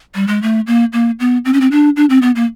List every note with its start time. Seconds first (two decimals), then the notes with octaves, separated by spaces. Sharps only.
0.15 G3
0.27 G#3
0.42 A3
0.67 A#3
0.93 A#3
1.20 B3
1.45 C4
1.53 C#4
1.61 C4
1.71 D4
1.96 D4
2.10 C4
2.22 B3
2.36 A#3